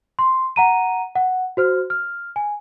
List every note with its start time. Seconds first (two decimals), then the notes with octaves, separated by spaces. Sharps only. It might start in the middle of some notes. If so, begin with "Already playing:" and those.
0.19 C6
0.56 F#5 A#5 D#7
1.16 F#5
1.57 F#4 C5 F6
1.90 F6
2.36 G#5